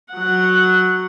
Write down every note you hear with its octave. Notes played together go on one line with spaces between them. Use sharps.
F#3 F#5